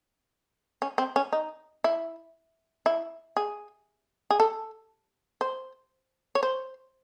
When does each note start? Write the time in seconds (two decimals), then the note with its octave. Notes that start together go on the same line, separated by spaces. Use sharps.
0.82 C#4
0.98 C4
1.16 C#4
1.32 D#4
1.84 E4
2.86 E4
3.37 G#4
4.30 G#4
4.40 A4
5.41 C5
6.35 C#5
6.43 C5